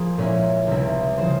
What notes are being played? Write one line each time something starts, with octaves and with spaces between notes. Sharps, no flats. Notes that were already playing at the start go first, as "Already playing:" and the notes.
Already playing: F3 A#3 G#4
A#2 G#3 C#4 E4
C#2 C3 G3 C4 E4
C#3 F3 C5